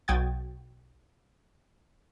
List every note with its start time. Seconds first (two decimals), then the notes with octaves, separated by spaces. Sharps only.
0.08 B1 F#4 G5 D#6 G#6 A6